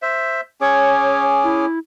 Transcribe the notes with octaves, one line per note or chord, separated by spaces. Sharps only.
C5 E5
C#4 G#4 C#5 D6
E4